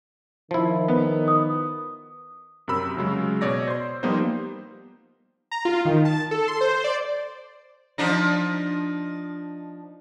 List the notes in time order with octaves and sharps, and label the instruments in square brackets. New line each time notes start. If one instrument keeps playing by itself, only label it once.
[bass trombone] D#3 [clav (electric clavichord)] F3 E4
[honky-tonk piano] B3
[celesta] D#6
[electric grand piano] F#2 C3 A#4 B5 E6
C#3 F#3 G#3
B2 C#5 D5 A#6
C5 C6
F3 G3 A#3 B3 D#4 C5
[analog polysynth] A#5
F4
D#3
A5
A4
C6
C5
D5
[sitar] F3 D4 D#4